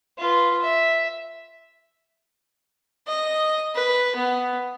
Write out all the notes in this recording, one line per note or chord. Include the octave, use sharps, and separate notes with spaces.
F4 B4
E5
D#5
B4
B3